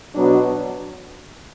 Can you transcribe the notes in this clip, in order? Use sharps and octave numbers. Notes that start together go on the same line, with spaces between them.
B2 F#3 B3 D4 F#4